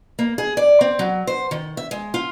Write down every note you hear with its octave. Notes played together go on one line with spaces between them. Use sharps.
A#3
G#4
D5
C4
F#3
C5
D#3
E5
G#3
F4